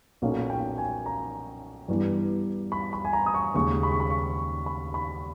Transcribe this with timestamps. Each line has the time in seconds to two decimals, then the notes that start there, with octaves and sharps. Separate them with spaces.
0.22 B1 A#2 A#3 C#4
0.50 G5
0.78 G#5
1.06 A#5
1.88 G2 E3 G3 B3
2.72 B5
2.93 B5
3.05 G#5
3.13 A#5
3.26 D#6
3.34 C#6
3.54 D#2 C#3 G#3 C#6
3.83 B5
3.92 C#6
4.00 B5
4.10 C#6
4.66 B5
4.94 B5